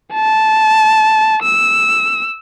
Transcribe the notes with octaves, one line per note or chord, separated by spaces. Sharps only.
A5
E6